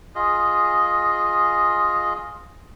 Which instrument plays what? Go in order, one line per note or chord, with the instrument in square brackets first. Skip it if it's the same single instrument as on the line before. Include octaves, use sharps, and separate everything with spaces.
[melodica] F4 G#4 D#5